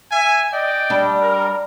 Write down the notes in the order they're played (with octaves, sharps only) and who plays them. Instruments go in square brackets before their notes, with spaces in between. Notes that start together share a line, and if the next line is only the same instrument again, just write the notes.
[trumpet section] E5 G#5
D5 D#5 G5
[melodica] G3 [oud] D4
[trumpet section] A#4